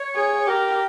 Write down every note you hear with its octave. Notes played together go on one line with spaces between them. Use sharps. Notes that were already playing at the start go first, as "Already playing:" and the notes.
Already playing: C#5
G#4
G4 A#4